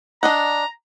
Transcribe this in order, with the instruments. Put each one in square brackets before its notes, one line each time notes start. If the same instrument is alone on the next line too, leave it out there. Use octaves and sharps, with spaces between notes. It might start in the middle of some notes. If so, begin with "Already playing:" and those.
[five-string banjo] D4 D#5 F#5 [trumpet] A#5